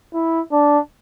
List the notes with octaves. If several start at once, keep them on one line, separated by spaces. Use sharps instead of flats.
E4
D4